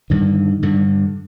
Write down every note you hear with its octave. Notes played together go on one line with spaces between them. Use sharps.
G2 D3 D#3
G2 D3